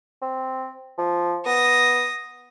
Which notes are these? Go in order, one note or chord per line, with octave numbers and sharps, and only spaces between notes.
C4
F3
B3 D#6 A#6